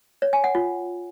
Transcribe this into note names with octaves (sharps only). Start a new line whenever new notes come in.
C#5
G#5
F#5
F4